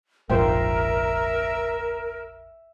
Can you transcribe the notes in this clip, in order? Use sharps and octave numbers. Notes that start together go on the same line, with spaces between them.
F1 A#1 G#2 F4 A#4 C5 E5 G5